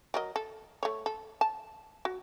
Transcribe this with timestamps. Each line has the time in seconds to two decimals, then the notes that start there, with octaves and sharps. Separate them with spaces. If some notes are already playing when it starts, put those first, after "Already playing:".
0.14 F#3 A#4 D#5
0.36 A4
0.83 A3 C#5
1.06 A4
1.41 A5
2.05 F#4